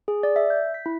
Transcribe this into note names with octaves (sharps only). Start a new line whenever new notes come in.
G#4
D5
E5
G6
B6
E4